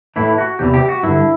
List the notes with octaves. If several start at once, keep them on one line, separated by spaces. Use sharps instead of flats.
A2 E3 E4
F#4
E2 C3 E3 G4
G4
F#4
G2 D3 E4